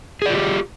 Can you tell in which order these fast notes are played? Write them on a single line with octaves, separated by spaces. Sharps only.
G#4 D5 F4 G4